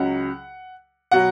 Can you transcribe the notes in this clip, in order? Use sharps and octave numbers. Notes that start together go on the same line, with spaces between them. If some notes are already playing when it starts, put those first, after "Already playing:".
Already playing: C#2 C#3 F#3 F#5
B2 F#3 F#5